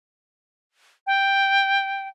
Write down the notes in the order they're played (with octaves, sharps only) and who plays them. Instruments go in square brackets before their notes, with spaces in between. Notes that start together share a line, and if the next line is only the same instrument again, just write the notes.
[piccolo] G5